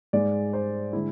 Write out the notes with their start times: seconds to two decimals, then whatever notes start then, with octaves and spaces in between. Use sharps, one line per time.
0.13 G#2 G#3 D5
0.53 C5
0.93 D3 G#3 E4